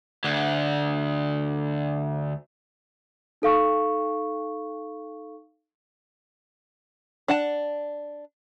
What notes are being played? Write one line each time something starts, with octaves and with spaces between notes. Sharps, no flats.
D2 D3
D#4 A4 F5 C#6
D4 F#5 A5